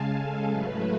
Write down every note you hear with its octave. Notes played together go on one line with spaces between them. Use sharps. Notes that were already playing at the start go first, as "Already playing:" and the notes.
Already playing: C#3 G#3 F5 G#5 A5
A4
A2 F#3 A3 B4